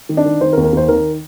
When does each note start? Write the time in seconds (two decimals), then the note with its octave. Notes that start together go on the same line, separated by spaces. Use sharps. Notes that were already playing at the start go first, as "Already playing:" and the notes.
0.09 D#3
0.17 D4
0.26 D#3
0.41 D#3 C5
0.53 A#4
0.57 D#2
0.64 A#4
0.73 D#2 C5
0.88 D#3 A#4